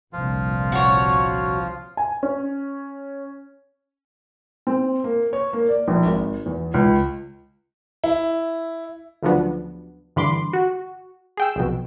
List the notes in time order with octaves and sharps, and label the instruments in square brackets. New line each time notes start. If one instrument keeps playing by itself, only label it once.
[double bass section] G1 C2 A#2 [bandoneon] F3 F4
[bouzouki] F#4 C#5
[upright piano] G#5
C#4
[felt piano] C4
A#3
C#5
A#3
D5
A#1
G#1
E2
C#2
[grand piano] E4
[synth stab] D2 C#3 F3 F#3 B3 D4
G2 D3 E3 B5 C6 D6
F#4
G#4 G5 E6
B1 F2 B2